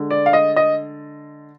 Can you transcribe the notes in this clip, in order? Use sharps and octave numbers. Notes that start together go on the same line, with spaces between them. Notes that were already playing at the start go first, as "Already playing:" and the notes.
Already playing: D3 G#3
D5
F5
D#5
D#5